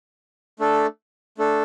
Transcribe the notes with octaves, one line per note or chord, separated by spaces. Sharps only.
A3 D4 A4
A3 D4 A4